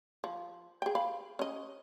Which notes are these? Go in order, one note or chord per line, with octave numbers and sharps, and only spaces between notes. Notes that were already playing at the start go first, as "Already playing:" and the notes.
F3
G#4 G5
F5 B5
C#4 D#5